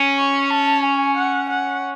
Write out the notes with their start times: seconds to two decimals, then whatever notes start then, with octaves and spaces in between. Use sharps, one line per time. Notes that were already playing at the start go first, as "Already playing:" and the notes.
Already playing: C#4
0.18 C#6
0.50 A5
0.84 G#5
1.17 F#5
1.50 F#5